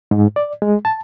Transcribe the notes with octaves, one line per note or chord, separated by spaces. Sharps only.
G#2
D5
G#3
A5